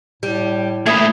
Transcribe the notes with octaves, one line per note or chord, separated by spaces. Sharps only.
A2 G3
A#2 A3 E4 B5 D#6 G#6